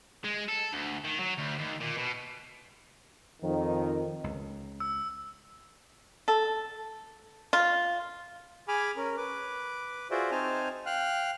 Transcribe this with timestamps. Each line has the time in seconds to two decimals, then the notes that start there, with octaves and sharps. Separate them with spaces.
0.24 G#3
0.48 A4
0.73 D2
1.04 D#3
1.19 F#3
1.38 D2
1.58 D#2
1.80 A#2
1.97 B2
3.42 F2 D#3
4.24 C#2
4.80 E6
6.28 A4
7.53 F4
8.68 G#4 G#5 B5 D6 F6
8.97 C#4 A#4
9.17 B4 D6
10.11 F4 F#4 G#4 C5 D5 E5
10.31 C4 D#4 C5 G#5 A5 F6
10.86 F5 G5 F6 F#6